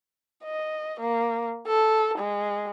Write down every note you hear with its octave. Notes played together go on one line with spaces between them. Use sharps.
D#5
A#3
A4
G#3